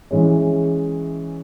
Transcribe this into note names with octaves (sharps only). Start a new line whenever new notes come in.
E3 G#3 C#4